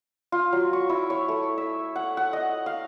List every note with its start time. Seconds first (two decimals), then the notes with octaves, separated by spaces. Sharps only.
0.32 F4
0.53 F#3
0.73 C#6
0.90 E4
1.10 C#5
1.28 A3
1.58 E5
1.96 F#5
2.17 F#5
2.33 D#5
2.66 F5